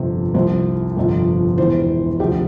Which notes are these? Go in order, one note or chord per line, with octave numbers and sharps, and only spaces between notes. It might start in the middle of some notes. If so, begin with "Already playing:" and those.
Already playing: G1 F2 C3
C2 C3 F3 C5
G1 F2 C3 F3
E1 E2 E3 C5
D2 C3 F3 G4